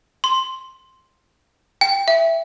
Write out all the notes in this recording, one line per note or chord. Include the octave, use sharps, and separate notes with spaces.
C6
G5
E5